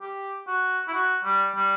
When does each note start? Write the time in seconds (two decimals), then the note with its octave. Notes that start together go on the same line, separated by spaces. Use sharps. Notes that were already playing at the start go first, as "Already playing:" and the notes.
0.01 G4
0.47 F#4
0.88 E4
0.94 F#4
1.24 G3
1.56 G3